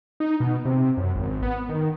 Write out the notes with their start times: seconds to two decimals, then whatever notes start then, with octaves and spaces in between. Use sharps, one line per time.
0.20 D#4
0.40 B2
0.65 C3
0.97 F#2
1.15 G#1
1.43 B3
1.69 D#3